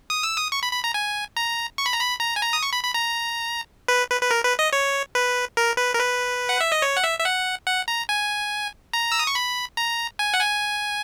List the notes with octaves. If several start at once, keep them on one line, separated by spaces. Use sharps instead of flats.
D#6
E6
D#6
C#6
B5
B5
A#5
G#5
A#5
C#6
B5
A#5
B5
A#5
G#5
A#5
D#6
C#6
B5
B5
A#5
B4
B4
B4
A#4
B4
D#5
C#5
B4
A#4
B4
A#4
B4
F#5
E5
D#5
C#5
F#5
E5
E5
F#5
F#5
A#5
G#5
A#5
E6
D#6
C#6
B5
A#5
G#5
F#5
G#5